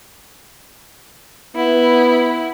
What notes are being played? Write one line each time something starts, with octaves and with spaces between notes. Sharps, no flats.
B3 E4